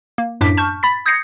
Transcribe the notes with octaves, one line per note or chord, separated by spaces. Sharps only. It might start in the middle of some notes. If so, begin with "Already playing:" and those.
A#3
F#2 A2 D4 D6 B6
A5 C#6 F6 G6
B5 A6 B6
D#6 G6 G#6 A#6 C7 C#7